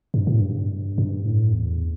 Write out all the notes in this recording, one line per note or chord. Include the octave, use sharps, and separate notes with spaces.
G2
A2
G2
G2
A2
E2